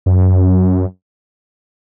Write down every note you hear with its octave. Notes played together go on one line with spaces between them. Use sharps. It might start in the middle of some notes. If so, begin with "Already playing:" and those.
F#2